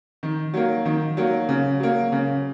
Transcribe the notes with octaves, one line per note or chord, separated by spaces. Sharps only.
D#3
F#3 A#3
D#3
F#3 A#3
C#3
F#3 A#3
C#3